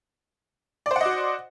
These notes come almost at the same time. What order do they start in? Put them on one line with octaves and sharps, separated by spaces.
D5 C5 F#5 D#5 F#4